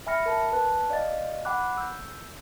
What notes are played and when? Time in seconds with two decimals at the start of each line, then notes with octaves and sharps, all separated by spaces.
0.06 E5 G#5 B5 F6 A#6 C#7
0.26 A#4 A5
0.52 B4 A5 F#6
0.90 D5 D#5 F5 A6
1.45 F#5 G#5 B5 D6 F#6
1.78 E6 G6